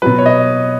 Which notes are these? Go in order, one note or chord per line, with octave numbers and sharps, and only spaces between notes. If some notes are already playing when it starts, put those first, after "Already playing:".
B2 F#3 B4
C#5
D#5